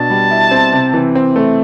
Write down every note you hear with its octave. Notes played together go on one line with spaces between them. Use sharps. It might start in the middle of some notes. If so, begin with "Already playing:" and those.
Already playing: B2 D4 A5
G3
E4
C4
C3
E3
C4
A3